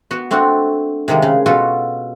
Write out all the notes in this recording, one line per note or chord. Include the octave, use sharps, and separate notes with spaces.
B3 F#4
A3 C4 D4 F#4
C3 D#3 G#3 A#3
C#3
B2 F4 F#4 A4 B4